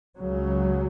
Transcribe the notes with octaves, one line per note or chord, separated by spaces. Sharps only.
C#2 C#3 F#3